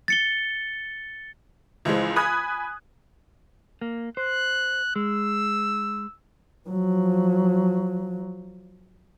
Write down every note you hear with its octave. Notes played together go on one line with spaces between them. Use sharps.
A6 C#7 G7
C#2 E3 F3 G#3
G#5 B5 D#6 F#6 G#6
A#3
C5 F#6
G#3 E6
F3 F#3